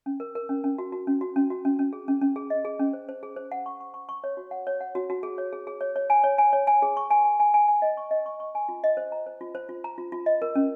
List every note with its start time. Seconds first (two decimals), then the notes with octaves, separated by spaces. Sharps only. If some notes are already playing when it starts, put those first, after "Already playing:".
0.06 C#4
0.20 A#4
0.35 A#4
0.49 C#4
0.64 C#4
0.78 F#4
0.92 F#4
1.07 C#4
1.21 F#4
1.36 C#4
1.50 F#4
1.65 C#4
1.79 C#4
1.93 G#4
2.08 C#4
2.22 C#4
2.36 G#4
2.50 D#5
2.65 G#4
2.80 C#4
2.93 C5
3.09 C5
3.23 G#4
3.36 C5
3.52 F#5
3.66 C#6
3.80 C#6
3.94 C#6
4.09 C#6
4.24 C#5
4.37 F#4
4.51 F#5
4.67 C#5
4.81 F#5
4.95 F#4
5.10 F#4
5.23 G#4
5.38 C#5
5.53 G#4
5.67 G#4
5.81 C#5
5.96 C#5
6.10 G#5
6.24 C#5
6.38 G#5
6.53 C#5
6.67 G#5
6.82 G#4
6.97 C#6
7.10 G#5
7.25 G#5
7.40 G#5
7.54 G#5
7.68 G#5
7.82 D#5
7.97 C#6
8.11 D#5
8.26 C#6
8.40 C#6
8.55 G#5
8.69 F4
8.84 D#5
8.97 C5
9.12 A#5
9.27 C5
9.41 F4
9.55 C5
9.69 F4
9.84 A#5
9.98 F4
10.12 F4
10.26 D#5
10.42 A#4
10.55 C#4